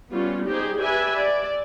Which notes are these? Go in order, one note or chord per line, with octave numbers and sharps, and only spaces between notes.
G3 B3 C#4 F4
D#4 G4 G#4 C5
G4 B4 D5 E5 G#5
D5